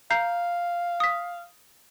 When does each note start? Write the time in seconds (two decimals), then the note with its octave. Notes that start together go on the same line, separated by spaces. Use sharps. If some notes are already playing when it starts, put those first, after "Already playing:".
0.11 F5 A#5 G6 C7
1.00 D#6 B6